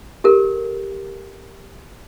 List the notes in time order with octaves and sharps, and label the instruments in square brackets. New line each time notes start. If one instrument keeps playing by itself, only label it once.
[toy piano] G4 A4 A#4